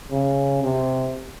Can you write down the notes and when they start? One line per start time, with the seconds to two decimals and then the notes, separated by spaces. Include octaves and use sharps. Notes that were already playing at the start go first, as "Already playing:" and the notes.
0.11 C#3
0.64 C3